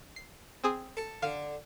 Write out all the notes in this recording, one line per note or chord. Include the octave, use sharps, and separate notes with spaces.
C7
C4 G#4 D#6
A4
D3 F5